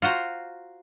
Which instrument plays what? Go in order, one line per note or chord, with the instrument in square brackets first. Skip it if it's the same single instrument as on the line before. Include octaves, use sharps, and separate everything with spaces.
[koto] F4 F#4 C5 A#5